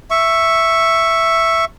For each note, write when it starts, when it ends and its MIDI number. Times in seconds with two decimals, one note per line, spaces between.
0.11 1.65 76
0.11 1.65 85